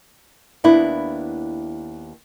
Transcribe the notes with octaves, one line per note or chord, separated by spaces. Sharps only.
D#2 B3 D4 E4